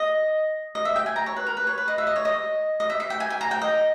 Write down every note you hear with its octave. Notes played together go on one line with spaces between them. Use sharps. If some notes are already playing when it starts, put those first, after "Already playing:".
Already playing: D#5
D#5
E5
G5
G#5
A#5
C#5
B4
A#4
B4
C#5
B4
D#5
E5
D#5
C#5
D#5
D#5
E5
E5
G5
G#5
G#5
A#5
G5
D#5